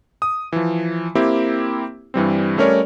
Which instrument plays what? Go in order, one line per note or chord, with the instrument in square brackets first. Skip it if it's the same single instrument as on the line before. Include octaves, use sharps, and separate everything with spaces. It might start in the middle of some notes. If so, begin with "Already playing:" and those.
[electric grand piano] D#6
E3 F3
A#3 C4 E4 G4
G2 E3 G3 C4
G3 A3 C#4 A#4 C#5 D5